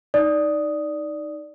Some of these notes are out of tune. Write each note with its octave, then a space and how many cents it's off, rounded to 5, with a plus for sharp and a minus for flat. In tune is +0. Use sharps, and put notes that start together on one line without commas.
D#4 +0 D5 +0 D#6 +0